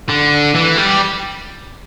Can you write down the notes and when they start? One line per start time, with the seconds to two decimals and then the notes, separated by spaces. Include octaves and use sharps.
0.09 D3
0.55 E3
0.77 G3